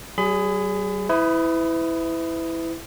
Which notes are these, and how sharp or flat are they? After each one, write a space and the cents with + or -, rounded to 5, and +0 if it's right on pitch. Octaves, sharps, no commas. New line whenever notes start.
G3 -45 G#4 +0 B5 +35
E4 -5 B4 +35 D#6 +0